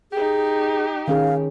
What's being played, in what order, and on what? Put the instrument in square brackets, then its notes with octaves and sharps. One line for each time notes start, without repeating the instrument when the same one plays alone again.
[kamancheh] D#4 G4 [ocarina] G#4
[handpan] D#3 C#4 G#4 [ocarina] F5